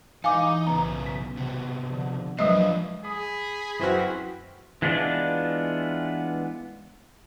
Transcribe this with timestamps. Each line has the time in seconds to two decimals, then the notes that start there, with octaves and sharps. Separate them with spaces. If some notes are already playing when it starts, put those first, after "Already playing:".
0.24 E3 G#3 D#4 F5 G#5 D6
0.67 B1 C#3 B3 A#5
1.06 B6
1.37 C3 B3
1.81 D3 F3
2.39 F3 F#3 G#3 A#3 D4 F4 B4 D#5
3.05 G#4 B5 D#6
3.80 F#2 E3 C4 E4 F#4 F6
4.82 E3 G#3 B3 D4 F4 D5